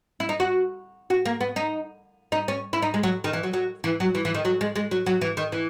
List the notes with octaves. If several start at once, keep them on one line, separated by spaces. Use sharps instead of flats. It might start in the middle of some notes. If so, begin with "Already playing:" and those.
E4
D#4
F#4
F#4
A#3
B3
D#4
D#4
C#4
E4
D#4
G#3
F#3
D#3
E3
F#3
F#3
E3
F#3
E3
E3
D#3
F#3
G#3
G#3
F#3
F#3
E3
D#3
E3